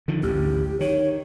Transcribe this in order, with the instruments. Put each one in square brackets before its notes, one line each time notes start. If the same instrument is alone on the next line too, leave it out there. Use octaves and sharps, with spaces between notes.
[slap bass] D3 D#3 F3
[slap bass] A1 D2 G#2 [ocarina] G4
[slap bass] D#3 [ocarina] C#5